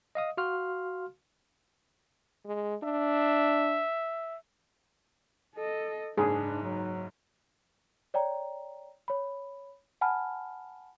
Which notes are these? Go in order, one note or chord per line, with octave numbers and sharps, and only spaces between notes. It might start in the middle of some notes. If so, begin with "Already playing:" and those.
D#5 F5 D#6
F#4 F5 C6 F6
G#3
D4 E5
A4 D#5
F#1 G#2 D4 D#4 G#4
F#3
C#5 D5 G5 A#5
C#5 B5
F#5 G#5 A5 B5 F6